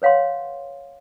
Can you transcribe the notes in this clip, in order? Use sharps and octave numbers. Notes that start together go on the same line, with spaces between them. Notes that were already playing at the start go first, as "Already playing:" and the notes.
B4 C#5 F5 F#5 C6